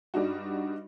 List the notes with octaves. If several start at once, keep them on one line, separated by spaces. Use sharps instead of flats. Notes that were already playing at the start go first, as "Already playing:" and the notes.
G2 G3 D4 D#4 F#4